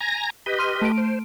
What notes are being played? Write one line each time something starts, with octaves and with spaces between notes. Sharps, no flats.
G#5 A#5 A#6
G4 B4 D#5
C6 F6 D#7
A3 D7
C5